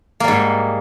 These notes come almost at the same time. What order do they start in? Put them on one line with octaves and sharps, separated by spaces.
A#3 G3 G#2